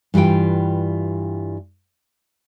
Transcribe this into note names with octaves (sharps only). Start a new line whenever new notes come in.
G2 E3 G3 F4 G5